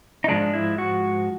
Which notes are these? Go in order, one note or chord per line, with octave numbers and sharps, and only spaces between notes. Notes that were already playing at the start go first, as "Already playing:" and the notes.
D#4
G#2 F3 G#3 D4
E4
F#4